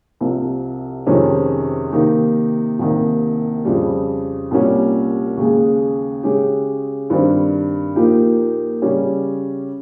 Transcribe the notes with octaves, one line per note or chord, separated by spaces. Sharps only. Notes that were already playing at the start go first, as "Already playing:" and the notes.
C2 C3 F3
F2 C3 D#3 G#3 C#4
C3 D#3 A#3 D#4 G4
C2 C3 D#3 A#3
F2 C#3 G3
C2 A#2 G3 C#4 G4
D#2 C#3 G#3
C#3 G#3 C#4 G4
G2 D#3 G3 C4
A#2 F3 A#3 D#4 G4
C#3 G3 C#4 G4